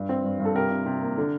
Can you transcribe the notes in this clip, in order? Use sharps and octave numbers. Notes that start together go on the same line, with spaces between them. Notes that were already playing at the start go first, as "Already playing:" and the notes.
Already playing: G2
C4
G2
G2
A4
C3 G4 A#4
C3
C3
A#3
D3